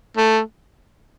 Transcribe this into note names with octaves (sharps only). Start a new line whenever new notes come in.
A3